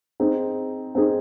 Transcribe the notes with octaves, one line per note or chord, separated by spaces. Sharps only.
C4 D#4 G#4
C4 D#4 G#4